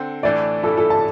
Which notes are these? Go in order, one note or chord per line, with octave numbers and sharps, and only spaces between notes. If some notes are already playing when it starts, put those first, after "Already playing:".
Already playing: D3 C4
A2 E3 A3 D4 D5
G2 E3 G3 E4 A4
A4
A5